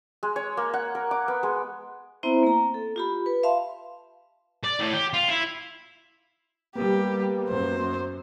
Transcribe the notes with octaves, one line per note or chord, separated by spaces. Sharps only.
G#3
C#5
A#3
F#5
A#4
D6
B3
G#3
B3 C4 E4 C5 E5 A#5
A#3 A#5
A4
F4 G4 B5
B4
E5 F5 A5 C6
D5
A2
G4
F4
E4
G3 A#3 B3 G4
F#2 C5